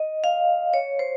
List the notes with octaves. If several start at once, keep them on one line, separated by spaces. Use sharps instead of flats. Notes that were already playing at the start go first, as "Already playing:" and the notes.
Already playing: D#5
F5
C#5
C5